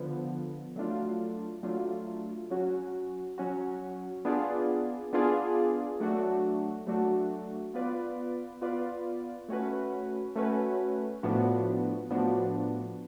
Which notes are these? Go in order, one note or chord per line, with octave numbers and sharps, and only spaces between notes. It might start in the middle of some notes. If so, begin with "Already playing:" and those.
Already playing: D3 F3 B3
F#3 A3 D4 F4
F#3 A3 D4 F4
F#3 C#4 F#4
F#3 C#4 F#4
B3 D4 F4 G#4 D5
B3 D4 F4 G#4 D5
F#3 A3 D4 F#4
F#3 A3 D4 F#4
B3 F4 B4 D5
B3 F4 B4 D5
A3 C#4 F#4 B4
A3 C#4 F#4 B4
A2 F3 B3 D4 F#4
A2 F3 B3 D4 F#4